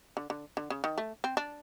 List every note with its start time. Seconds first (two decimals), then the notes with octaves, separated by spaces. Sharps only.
0.17 D3
0.30 D3
0.57 D3
0.70 C#3
0.84 D#3
0.98 A3
1.24 C4
1.37 D4